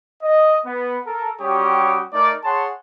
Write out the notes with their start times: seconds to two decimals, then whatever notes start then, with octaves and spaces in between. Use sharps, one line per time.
0.22 D#5
0.65 B3
1.05 A4 A#4
1.41 G3 C#4 F#4 G4 C#5 D#6
2.12 A3 D#4 A#4 D5
2.44 G#4 C#5 F#5 A5 C6